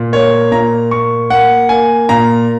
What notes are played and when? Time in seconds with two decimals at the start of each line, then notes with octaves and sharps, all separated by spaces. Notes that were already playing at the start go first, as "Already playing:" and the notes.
Already playing: A#2
0.13 A#3 C#5
0.52 A#2 A#5
0.91 A#3 C#6
1.30 A#3 F#5
1.69 A#3 G#5
2.09 A#2 A#5